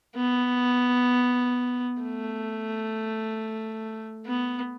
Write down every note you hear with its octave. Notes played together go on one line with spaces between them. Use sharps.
B3
A3
B3